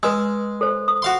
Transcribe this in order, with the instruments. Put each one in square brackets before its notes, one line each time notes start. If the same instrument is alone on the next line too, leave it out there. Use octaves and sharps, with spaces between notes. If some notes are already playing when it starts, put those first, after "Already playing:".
[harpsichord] G#3 [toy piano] B4 E6
[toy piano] A4 C5
D#6
[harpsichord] F#4 F5 C6